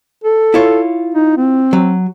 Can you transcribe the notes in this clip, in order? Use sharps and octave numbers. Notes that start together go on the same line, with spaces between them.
A4
E4 F4 C#5
D#4
C4
F#3